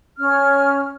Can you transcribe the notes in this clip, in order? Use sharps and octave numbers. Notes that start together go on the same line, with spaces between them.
C#4 F6